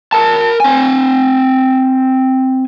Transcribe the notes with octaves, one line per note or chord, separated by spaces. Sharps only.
A#4 A5
C4 G#5